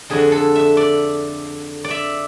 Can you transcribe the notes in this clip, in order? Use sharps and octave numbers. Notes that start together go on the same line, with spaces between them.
F2 D3 G#4
A4
E5
D5
D5
E5